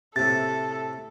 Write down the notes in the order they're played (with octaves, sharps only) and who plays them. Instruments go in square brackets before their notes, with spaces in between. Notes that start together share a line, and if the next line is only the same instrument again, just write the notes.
[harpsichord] A2 C3 [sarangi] A4 [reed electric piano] A6